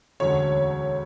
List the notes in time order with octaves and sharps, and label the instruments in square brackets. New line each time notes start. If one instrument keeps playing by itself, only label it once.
[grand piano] E1 D2 D3 F#3 C#4 [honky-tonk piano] C#5